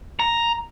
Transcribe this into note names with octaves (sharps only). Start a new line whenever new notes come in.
A#5